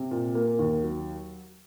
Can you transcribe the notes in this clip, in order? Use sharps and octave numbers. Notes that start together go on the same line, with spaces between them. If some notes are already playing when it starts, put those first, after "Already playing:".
Already playing: C3
A#2
A#3
D#2
F#3